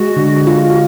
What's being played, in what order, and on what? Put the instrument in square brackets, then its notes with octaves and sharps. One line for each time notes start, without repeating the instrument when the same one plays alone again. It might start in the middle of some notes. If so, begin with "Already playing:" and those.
Already playing: [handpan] G#3 [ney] F#4
[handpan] D3
F4